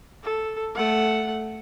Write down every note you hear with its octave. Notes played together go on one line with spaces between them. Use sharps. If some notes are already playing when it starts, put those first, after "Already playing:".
A4
A3 F#5